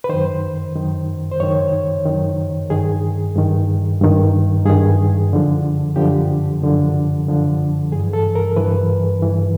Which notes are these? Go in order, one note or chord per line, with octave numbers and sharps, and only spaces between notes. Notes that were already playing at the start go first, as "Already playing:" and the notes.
B4
F#2 D#3 C5
F#2 D#3
C5
F#2 D#3 C#5
F#2 D#3
G2 D#3 G#4
G2 D#3
G2 D#3
G2 D#3 G#4
F#2 D3 F3
F#2 D3 F3 G4
F#2 D3 F3
F#2 D3 F3
G2 E3 G#4
A4
A#4
G2 E3 B4
G2 E3